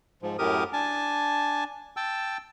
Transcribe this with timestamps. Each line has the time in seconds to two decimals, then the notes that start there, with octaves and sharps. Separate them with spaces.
0.22 G#2 F3
0.39 F#2 A2 G4 A#4 D#6
0.73 D4 G#5 A5
1.97 G5 A5 E6